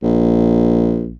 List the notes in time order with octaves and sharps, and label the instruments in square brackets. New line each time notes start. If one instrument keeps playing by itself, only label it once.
[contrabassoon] A#1